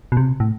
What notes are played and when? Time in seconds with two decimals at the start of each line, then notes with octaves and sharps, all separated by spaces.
0.12 B2
0.17 C3
0.40 A2